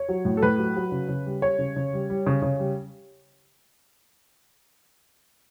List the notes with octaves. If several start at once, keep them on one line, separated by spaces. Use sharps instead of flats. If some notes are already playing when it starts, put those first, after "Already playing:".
Already playing: C#5
F#3
A2
A4
A2 B4
F#3
F#3
C#3
C#3
G3
G3 C#5
C#3
C#3
G3
G3
C#3
C#3
G3